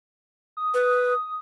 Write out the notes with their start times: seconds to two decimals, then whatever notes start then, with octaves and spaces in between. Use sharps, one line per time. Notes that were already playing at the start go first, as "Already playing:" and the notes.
0.57 D#6
0.74 B4